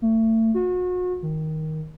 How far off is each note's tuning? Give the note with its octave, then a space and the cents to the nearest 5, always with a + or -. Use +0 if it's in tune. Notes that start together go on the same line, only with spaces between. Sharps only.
A3 +30
F#4 -35
D#3 +10